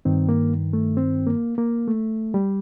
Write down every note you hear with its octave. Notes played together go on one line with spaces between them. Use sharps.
G2 D#3 C4
A#3
A3
C4
A#3
A#3
A3
G3